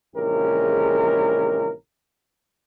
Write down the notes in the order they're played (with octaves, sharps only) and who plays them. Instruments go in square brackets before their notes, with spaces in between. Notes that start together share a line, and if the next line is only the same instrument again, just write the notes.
[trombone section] A#1 C#3 E3 G#3 G4 A#4